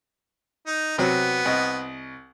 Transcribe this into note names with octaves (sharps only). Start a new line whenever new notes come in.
D#4
C3 F#3 B3
C2 D#5